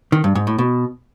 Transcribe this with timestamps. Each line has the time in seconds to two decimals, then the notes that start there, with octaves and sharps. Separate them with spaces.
0.12 D#3
0.24 G2
0.35 G#2
0.47 A2
0.58 B2